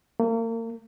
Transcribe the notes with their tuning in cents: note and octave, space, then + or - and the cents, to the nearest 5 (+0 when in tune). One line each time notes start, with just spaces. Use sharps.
A#3 -35